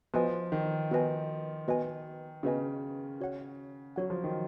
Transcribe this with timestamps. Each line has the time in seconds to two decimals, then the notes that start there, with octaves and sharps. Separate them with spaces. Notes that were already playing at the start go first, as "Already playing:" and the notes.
0.14 F3 B3 F#4 B4 D#5 G#5
0.52 D#3
0.91 B3 F#4 B4 D#5 G#5
1.68 B3 F#4 B4 D#5 G#5
2.43 C#3 B3 F#4 B4 D#5 G#5
3.21 F#4 C#5 F#5
3.96 F#3 F#4 C#5 F#5
4.10 F3
4.24 D#3